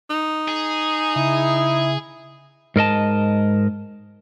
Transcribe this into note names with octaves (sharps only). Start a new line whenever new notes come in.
D#4
G#4
C#3 E4
G#2 A#4 D#5 A5